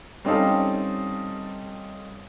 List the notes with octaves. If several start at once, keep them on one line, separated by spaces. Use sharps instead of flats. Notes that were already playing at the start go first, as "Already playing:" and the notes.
G3 C4 C#4 D#4 A4 F5